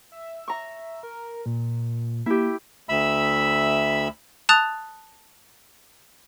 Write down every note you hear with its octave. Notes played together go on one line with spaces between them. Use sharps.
E5
A#5 C#6
A#4
A#2
A#3 E4 G4
D2 E5 B5 E6
A5 D#6 F#6 A6 F7